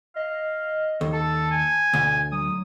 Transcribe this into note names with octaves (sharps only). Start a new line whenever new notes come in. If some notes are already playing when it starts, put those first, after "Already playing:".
D#5 F5
D#2 A4
A4 A5
G#5
D2 B2
F#3 D#6